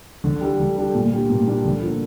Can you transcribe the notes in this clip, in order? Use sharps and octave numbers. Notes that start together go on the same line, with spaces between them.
D3
G3 D4 A4
D3
G3 D4 A4
A#2
G3 D4
A#2
G3 D4
D3
F3 A#3 D4